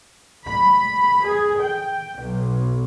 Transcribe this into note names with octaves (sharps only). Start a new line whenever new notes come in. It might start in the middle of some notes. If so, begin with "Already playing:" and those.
B5
G#4
G5
B1